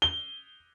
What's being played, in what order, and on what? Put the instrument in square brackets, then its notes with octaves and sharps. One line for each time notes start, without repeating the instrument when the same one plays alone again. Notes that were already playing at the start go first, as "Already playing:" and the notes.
[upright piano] G7